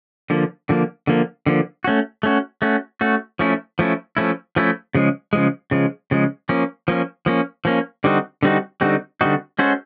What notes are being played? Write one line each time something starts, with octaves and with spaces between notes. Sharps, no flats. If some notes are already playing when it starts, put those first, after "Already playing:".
D3 F3 A#3
D3 F3 A#3
D3 F3 A#3
D3 F3 A#3
A3 C#4 F#4
A3 C#4 F#4
A3 C#4 F#4
A3 C#4 F#4
F3 A3 C#4 E4
F3 A3 C#4 E4
F3 A3 C#4 E4
F3 A3 C#4 E4
C#3 F3 G#3
C#3 F3 G#3
C#3 F3 G#3
C#3 F3 G#3
F3 A#3 C#4
F3 A#3 C#4
F3 A#3 C#4
F3 A#3 C#4
D3 G3 C4 D#4 F#4
D3 G3 C4 D#4 F#4
D3 G3 C4 D#4 F#4
D3 G3 C4 D#4 F#4
G#3 C#4 F#4 A4 C5